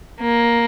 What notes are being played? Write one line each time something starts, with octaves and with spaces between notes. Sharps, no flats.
A#3